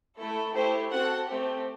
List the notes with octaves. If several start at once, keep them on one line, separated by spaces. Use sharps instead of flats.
A3 E4 A4
A3 E4 G4 C5
C4 F#4 A4 F#5
A3 C4 G4